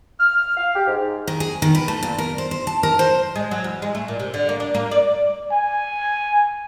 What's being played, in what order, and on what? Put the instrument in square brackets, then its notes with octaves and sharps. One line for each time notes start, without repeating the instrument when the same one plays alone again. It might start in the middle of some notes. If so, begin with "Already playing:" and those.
[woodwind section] F6
F5
G4
G#2
[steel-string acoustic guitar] D#3
G#4
D#3
B4
A3
A#2
A#4
C5
C5
A5
A#4
C5
[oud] G#3
F#3
E2
G#3
A3
A#2
C3
D3
A#3
D4
A#3
D5
[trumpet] G#5